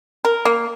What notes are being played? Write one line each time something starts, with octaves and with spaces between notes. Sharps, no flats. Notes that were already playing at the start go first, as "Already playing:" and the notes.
A#4
A#3